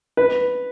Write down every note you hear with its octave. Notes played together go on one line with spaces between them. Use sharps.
B4